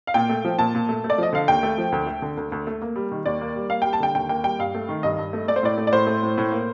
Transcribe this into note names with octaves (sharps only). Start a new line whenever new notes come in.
F5
A#2 G5
A3
F3
A#2 A5
A#2
A3
A3
D5
F3 D#5
D3 F5
D#2 G5
A3
F3
D2
A3
D3
D2
D2
A3
A#3
G3
D#3
D#2 D5
A#3
G3
A#3 F5
G3 G5
A5
D3 G5
D#2 G5
A#3 G5
G3 G5
G2 F5
A3
D#3
G2 D#5
G2
A3
A3 D5
C5
A2 D5
A3
D5
A2 C5
A3
A2
A2
A#3